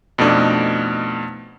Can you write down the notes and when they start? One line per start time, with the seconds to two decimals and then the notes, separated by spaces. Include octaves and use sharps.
0.18 F2 B2 A3 D4 D#4